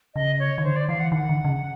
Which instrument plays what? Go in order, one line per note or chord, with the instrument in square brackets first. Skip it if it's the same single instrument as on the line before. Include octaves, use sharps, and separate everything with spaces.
[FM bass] C#3 [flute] D#5
[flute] C#5
[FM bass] D#3
[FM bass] D3 [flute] C5
[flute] D5
[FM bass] E3 [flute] F5
[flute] F#5
[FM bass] D#3 [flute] F#5
[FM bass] D3
C#3